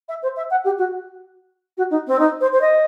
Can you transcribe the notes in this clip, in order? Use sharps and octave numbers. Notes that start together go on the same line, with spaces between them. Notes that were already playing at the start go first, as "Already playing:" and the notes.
E5
C5
E5
F#5
G4
F#4
F#4
D#4
C4
D#4
C5
C5
D#5